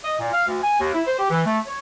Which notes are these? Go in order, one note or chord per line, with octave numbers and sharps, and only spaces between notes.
D#5
A#2
F5
D2
G#5
D#2
E4
C5
G4
E3
A3
C#5